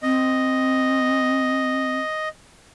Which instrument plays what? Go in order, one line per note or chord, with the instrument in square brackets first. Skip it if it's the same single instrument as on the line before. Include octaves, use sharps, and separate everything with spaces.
[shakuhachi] C4 [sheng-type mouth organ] D#5